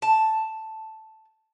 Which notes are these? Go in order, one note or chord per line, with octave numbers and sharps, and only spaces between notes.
A5